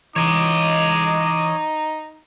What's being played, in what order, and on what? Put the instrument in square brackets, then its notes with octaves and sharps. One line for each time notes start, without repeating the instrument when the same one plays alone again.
[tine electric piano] E3 [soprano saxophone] D#4 [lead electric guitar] C#5 D#5 [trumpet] D6